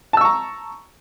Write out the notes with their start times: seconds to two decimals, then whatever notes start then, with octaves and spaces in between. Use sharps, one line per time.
0.13 A5
0.17 E6
0.21 C#6
0.25 A#5